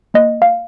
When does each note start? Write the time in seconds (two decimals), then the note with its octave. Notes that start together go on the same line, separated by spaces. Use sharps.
0.14 A#3 D#5
0.42 F5